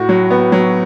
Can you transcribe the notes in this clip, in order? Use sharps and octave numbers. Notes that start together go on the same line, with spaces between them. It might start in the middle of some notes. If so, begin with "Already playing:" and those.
Already playing: A2 F#4
F#3
B3
F#3